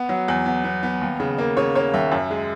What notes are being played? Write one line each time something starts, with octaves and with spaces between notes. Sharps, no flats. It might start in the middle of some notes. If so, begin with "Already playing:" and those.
Already playing: B3
F#3
E2
B3
B3
B3
D#2
C#3
A#3
C#3 C#5
A#3 C#5
D#2 E5
F#2
G#3